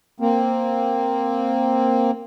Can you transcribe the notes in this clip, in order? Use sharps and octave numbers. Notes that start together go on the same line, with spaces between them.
A#3 C4